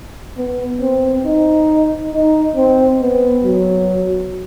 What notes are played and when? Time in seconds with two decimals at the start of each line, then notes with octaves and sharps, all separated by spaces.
0.38 B3
0.81 C4
1.25 D#4
2.13 D#4
2.57 C4
3.00 B3
3.44 F#3